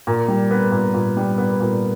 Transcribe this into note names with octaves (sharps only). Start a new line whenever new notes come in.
A#2
G3
B3
A#2
A#2
G3
B3
A#2